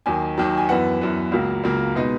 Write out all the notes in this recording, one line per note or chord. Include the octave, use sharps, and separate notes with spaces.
D#2 D#3 F#3 G#5
D#2 D#3 F#3
G#5
F#2 E3 B3 F#5
F#2 E3 B3
C#2 C#3 F#3 A#3
C#2 C#3 F#3 A#3
B2 G#3 B3 D#4